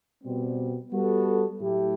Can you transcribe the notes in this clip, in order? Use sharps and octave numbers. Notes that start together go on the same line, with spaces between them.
B2 G3 C4
G3 B3 F#4 A4
A2 F#3 A3 E4 G4